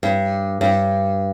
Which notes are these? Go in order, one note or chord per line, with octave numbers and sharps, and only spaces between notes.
G2
G2